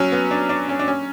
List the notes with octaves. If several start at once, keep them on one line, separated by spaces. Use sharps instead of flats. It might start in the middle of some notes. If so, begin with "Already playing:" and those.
Already playing: F#3 C#4
B3
D4
D4
C#4
D4
C#4